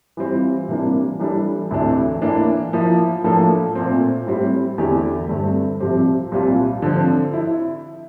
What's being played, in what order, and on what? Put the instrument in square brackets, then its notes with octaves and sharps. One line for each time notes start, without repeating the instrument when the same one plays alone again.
[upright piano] E3 G3 C4 F4
C3 E3 G3 A#3 D4
E3 G3 D4 A4
D2 C3 E3 A3 D4
A2 E3 A#3 D4
F3 A#3 E4
A2 F3 A#3 D4 A4
A#2 A3 C4
A2 G3 C4 E4
E2 D3 A3 E4 G4
G2 D3 A3 C4
C2 C3 F3 C4 G4
C2 A#2 G3 C4 F4
D3 F3 C4
E4